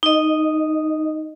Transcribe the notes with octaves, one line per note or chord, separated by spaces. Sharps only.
D#4 D#5